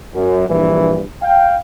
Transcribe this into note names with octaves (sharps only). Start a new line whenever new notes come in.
F#2
A#1 G2 E3
F5 G5